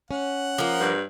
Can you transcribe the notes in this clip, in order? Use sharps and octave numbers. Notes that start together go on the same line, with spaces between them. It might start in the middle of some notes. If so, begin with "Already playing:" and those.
C#4 F#5
F3 A#3
G2